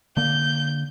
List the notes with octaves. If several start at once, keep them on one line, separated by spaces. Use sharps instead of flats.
D3 A#3 G6